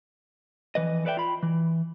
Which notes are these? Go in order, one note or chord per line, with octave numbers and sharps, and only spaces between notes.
F2 E3 B4 D#5
A4 B4 D5 E5 G5
F4 B5
E3